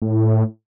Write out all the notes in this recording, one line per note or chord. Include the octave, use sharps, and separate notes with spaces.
A2